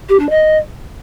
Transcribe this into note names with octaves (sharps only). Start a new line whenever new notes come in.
G4
D4
D#5